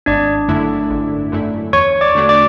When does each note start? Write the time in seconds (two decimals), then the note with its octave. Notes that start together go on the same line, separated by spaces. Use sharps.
0.06 G#1 D4 D5
0.49 F#2 D3 A3 E4
0.91 G#1
1.32 F#2 D3 A3 E4
1.73 E2 C#5 C#6
2.01 D5 D6
2.15 D3 A3 D4 F#4
2.29 D5 D6